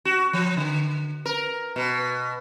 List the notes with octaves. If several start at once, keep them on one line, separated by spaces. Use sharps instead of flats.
F#4
F3
D3
A#4
B2